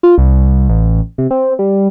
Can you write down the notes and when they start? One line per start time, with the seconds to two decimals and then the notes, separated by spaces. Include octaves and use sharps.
0.03 F4
0.18 C2
0.69 A1
1.18 C3
1.31 C4
1.59 G3